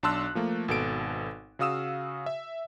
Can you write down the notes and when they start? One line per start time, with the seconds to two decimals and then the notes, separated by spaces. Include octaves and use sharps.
0.03 B1 D4 A5 C6 E6 F#6
0.35 F3 A3 A#3
0.68 G#1 B2 A4 D7
1.59 C#3 F#4 F5 D#6 E6 E7
2.26 E5